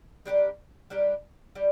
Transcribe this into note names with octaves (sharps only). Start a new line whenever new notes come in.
G3 D4 G4 A#4
G3 D4 G4 A#4
G3 D4 G4